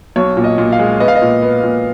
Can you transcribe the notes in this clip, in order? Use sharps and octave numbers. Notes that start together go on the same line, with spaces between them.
B1 C#5
A#2
D#5
A#2
F5
G#3
B3 D#5
F5
D#5
A#2
B3
A#2